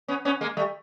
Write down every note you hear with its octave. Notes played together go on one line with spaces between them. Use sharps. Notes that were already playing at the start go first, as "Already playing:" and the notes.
B3 C#4
B3 C#4
G#3 A#3
G3 A3